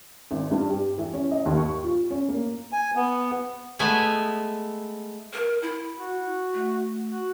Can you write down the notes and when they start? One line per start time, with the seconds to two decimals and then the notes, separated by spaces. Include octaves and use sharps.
0.31 G#1
0.51 G2
0.69 G4
0.98 E3
1.13 C#4
1.31 D#5
1.46 D#2
1.57 C#6
1.83 F4
2.10 C#4
2.29 A#3
2.72 G#5
2.95 B3
3.79 G#3 A3 B3 E5 G#5
5.33 A#4
5.62 E4
5.99 F#4
6.54 A3
7.09 F#4